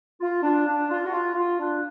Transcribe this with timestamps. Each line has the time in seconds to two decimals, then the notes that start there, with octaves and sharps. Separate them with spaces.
0.20 F4
0.42 D4
0.66 D4
0.89 F4
1.05 F#4
1.12 F4
1.34 F4
1.58 D4